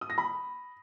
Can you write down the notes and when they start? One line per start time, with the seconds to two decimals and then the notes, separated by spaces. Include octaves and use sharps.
0.01 D#6
0.10 A#6
0.18 B5